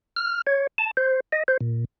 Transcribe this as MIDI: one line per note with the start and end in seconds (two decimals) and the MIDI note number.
0.16 0.42 89
0.47 0.67 73
0.78 0.91 81
0.97 1.20 72
1.32 1.43 75
1.48 1.57 72
1.61 1.85 46